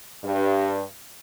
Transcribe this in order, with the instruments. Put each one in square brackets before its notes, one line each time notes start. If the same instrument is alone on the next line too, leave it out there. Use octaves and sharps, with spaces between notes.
[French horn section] G2